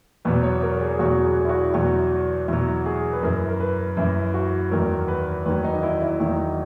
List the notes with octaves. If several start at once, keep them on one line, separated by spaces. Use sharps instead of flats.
E2 B2 F#3 B4
C#5
A#4
G#4
E2 B2 F#3 F#4
G#4
E4
F#4
E4
E2 B2 F#3 F#4
E2 B2 F#3 E4
G#4
B4
F#2 E3 A#4
A#4
B4
F#2 E3 E4
F#4
E2 D#3 F#3 A#4
B4
E2 D#3 F#3 B4
D#4
D#4
E4
E4
E2 D#3 F#3 D#4